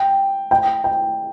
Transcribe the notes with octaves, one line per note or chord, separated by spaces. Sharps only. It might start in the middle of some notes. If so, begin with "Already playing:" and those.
Already playing: G5
G5
G5